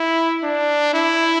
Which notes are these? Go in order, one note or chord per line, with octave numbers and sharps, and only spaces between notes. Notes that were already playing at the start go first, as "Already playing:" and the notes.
Already playing: E4
D4
E4